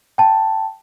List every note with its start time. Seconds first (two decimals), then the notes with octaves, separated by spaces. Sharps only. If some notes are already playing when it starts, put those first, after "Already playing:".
0.18 G5 A5